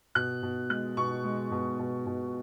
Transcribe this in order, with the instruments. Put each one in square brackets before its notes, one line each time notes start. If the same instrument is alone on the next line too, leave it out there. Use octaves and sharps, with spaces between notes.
[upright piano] B2 F#6
B2
G#3 F#6
B2 C#6
G#3
B2
B2
B2